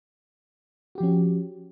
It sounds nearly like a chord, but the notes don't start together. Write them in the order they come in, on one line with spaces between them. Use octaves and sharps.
F#4 G4 F3 C#4